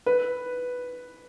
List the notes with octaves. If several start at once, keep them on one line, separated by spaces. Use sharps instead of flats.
B4